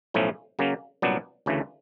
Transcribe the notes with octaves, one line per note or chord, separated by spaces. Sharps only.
B1 A2 F3 A3 C#4
C#3 F#3 A#3 C#4
C2 A#2 F#3 B3 D4
D2 C#3 E3 A3